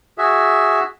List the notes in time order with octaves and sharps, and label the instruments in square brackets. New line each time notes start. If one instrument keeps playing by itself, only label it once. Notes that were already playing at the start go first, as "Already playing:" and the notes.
[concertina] F#4 G#4 E5